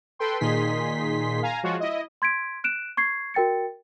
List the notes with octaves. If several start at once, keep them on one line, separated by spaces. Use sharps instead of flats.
A4 B4 G5 C6
A#2 D#3 D#4 G#4 C6 B6
F5 G#5 A#5
F3 G#3 F4 F#4 C#5
E4 D#5
C6 G#6 B6 D7
F#6 D7 E7
C#6 G#6 C7
F#4 A#4 G5 A6 C#7